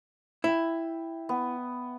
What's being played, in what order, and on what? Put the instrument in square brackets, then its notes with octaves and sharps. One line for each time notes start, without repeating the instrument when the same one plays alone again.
[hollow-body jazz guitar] E4 [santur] E5 G5
[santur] B3